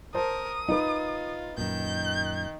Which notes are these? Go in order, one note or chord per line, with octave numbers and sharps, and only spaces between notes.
A#4 C5 A5 D#6
D#4 F4 B4
F#2 A#2 D#3 G6